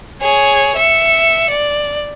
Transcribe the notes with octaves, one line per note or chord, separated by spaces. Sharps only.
G#4 C#5
E5 C#7
D5